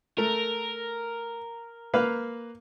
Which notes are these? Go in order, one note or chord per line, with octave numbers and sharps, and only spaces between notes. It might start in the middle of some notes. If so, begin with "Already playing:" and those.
A3 A#4
A#3 B4 F5